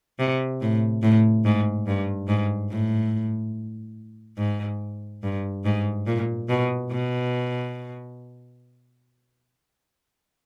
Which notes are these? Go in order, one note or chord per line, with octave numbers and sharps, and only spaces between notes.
C3
A2
A2
G#2
G2
G#2
A2
G#2
G2
G#2
A#2
B2
B2